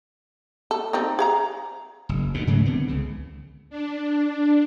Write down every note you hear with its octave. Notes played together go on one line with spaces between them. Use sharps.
A4
G3 C4 D#4
G#4 F5 A#5
F#1
D2 B2
G#2 C#3 F#3 A3
D3 D#3 B3 C4
C#2 C#3
D4